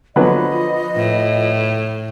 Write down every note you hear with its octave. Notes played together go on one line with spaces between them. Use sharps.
D3 F3 F#3 B3 B4 D#5 B5
A2